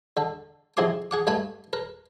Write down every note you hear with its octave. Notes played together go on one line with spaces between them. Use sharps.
D3 A4
F2 C3 E4 G#4 C6 D6
G#4 F#5 D6
G2 A3 B4 G#5 B5
A#4 B4